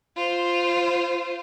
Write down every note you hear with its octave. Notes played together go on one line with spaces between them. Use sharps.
F4 C5